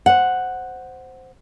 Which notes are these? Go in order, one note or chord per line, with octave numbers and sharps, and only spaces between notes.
C5 F#5